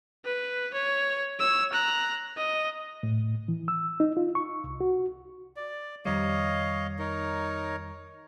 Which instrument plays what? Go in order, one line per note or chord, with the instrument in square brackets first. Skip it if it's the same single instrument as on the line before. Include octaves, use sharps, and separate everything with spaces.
[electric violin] B4
C#5
C#5 E6
A#5 F#6
D#5
[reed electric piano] A2
E3
E6
D#4
F4
C#6
C2
F#4
[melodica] D5
[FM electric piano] F2 D#3 G3 [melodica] C#5 D#5 F5
[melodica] D#4 A#4 C#5